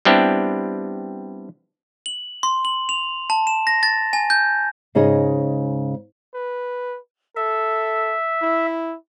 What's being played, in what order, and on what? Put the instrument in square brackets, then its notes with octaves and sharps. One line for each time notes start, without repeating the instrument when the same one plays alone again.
[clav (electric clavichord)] G3 B3 C4 D4 E4 G4
[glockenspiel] F#7
C6
F#7
F7
A5
E7
A#6
A6
G#5
G6
[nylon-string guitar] G#2 C#3 D#4 G#4 D#5
[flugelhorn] B4
[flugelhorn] A4 [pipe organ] E5
[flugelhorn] E4